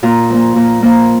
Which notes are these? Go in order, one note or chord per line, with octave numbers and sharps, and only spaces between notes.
A#2 F4
F3 A#3
A#2
F3 A#3